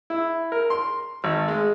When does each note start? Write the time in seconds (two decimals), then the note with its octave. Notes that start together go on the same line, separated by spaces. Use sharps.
0.10 E4
0.52 A#4
0.70 C6
1.24 G#1
1.48 G#3